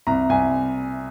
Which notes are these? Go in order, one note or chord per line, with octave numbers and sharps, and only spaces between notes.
C2 A#5
C2 G#5